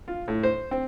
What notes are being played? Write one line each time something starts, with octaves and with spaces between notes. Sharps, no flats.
F4
A2
C5
C4